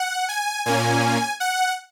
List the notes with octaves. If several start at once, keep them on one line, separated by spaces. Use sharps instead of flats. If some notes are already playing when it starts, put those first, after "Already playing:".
Already playing: F#5
G#5
A#2 A#3 C#4 G#5
F#5